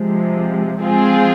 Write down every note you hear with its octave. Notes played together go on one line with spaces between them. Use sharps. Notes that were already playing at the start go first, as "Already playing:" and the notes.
Already playing: C3 F3 G#3
F3 G#3 C4 F4 G#4